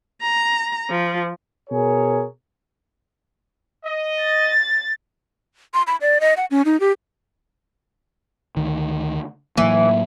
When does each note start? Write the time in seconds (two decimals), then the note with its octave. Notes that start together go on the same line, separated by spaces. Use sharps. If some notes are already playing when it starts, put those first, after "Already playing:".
0.22 A#5
0.90 F3
1.70 B2 G#4 A#4 C#5
3.84 D#5
4.20 A6
5.74 C6
5.87 B5
6.01 D5
6.21 D#5
6.37 F#5
6.51 C#4
6.65 D#4
6.80 G4
8.57 D2 D#3
9.57 A2 E3 F#3 A#3